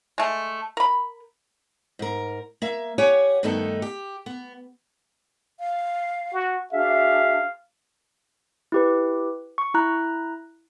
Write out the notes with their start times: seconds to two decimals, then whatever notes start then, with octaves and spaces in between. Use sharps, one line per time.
0.18 G#3 A3
0.77 A#4 B5
1.99 G#2 A#4
2.62 A#3 E5
2.98 G4 C#5 F#5 G#5
3.43 G2 D#3 A3 B3 D#4 A4
3.82 G4
4.26 B3
5.60 F5
6.33 F#4
6.73 D4 F#4 G#4 E5 F5
8.72 E4 G4 B4
9.58 C#6
9.74 E4 A#5 F#6